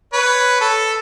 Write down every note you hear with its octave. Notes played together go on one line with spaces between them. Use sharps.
B4 C#5
A4